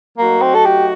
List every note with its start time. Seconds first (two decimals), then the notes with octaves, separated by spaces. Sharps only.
0.18 F#3 A3 A#3 D#4 F#4
0.42 C4
0.54 A4
0.65 G4